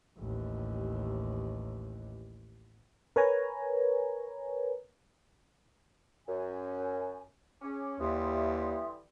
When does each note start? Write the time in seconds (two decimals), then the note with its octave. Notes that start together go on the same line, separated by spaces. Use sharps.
0.17 A1 D#2
3.16 A#4 B4 C#5 G#5 A#5
6.27 F#2 G#5
7.62 C#4 G#4 D6
8.00 D#2 D3 E3 G3 E5 C6 D#6